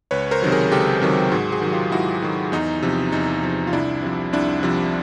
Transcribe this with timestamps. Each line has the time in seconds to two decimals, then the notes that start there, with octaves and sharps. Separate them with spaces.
0.11 C#2 B4 C#5
0.31 A#4 C5
0.42 C3 D#3 F#3
0.52 G#4 A#4
0.72 C#2 G4 A4
1.02 C3 D#3 F#3
1.32 G#2 F#4 G#4
1.52 F#4 G#4
1.62 D#3 F#3
1.72 F4 G4
1.92 G#2 E4 F#4
2.22 D#3 F#3
2.52 E2 D#4
2.83 C3 F3
3.12 E2 D#4
3.43 C3 F3
3.67 F4
3.73 C2 D4 E4
4.03 C3 F3
4.33 C2 D4 E4
4.63 C3 F3